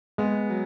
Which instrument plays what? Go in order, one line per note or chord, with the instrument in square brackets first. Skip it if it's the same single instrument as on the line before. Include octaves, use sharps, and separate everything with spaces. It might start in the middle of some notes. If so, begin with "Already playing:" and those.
[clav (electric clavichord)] G#3 [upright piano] B3
[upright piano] F#3